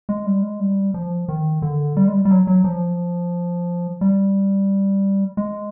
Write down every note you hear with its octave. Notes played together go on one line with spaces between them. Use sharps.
G#3
G3
G#3
G3
F3
D#3
D3
G3
G#3
G3
G3
F#3
F#3
F3
G3
G#3